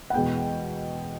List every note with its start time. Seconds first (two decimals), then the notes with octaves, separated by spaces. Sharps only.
0.10 F#5
0.13 E2 B2 G#3 B3 G5